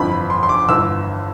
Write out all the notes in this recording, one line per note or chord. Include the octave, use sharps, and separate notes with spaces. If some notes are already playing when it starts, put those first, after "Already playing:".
Already playing: G1 F2 E3 B5
C6
C6
D6
G1 G2 E3 E6